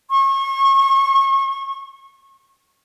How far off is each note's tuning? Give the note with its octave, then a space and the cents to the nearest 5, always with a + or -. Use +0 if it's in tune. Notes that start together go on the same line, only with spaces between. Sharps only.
C#6 -35